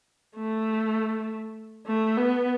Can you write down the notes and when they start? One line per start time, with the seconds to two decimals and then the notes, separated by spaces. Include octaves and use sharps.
0.36 A3
1.87 A3
2.17 B3